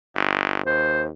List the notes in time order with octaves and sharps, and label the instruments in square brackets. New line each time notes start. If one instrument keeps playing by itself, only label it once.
[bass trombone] G1
[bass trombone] D#2 [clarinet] C5